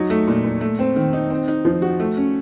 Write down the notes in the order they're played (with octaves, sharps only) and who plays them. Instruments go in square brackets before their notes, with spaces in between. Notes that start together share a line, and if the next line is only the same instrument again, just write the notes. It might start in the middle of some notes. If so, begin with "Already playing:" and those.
Already playing: [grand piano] F#3 D#4
A3
A#2
A#2
A3
C4
D#3
D#4
C4
D#4
F3
F#4
A3
C#4